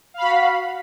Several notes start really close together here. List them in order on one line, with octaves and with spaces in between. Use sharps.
F5 B5 F#4